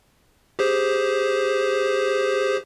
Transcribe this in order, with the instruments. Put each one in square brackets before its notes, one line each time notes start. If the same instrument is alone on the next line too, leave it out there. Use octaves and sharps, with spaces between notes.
[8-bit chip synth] G4 G#4 C5